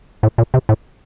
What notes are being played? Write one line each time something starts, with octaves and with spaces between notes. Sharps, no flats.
A2
A#2
C3
A2